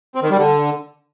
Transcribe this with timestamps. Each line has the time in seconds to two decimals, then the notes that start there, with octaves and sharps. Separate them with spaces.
0.15 C4
0.23 D#3
0.30 G3
0.38 D3